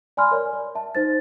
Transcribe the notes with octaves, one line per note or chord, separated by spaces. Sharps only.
D5 G#5 B5 C6 F6
A#4 C#5 D5
D5
E5 A5
D#4 C5 A6